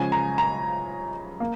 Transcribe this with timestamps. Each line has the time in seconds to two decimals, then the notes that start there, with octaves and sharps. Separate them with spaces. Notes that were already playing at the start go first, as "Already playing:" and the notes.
Already playing: C#3 F3 G#3 G#5
0.12 A#5
0.38 A#5
1.40 A#3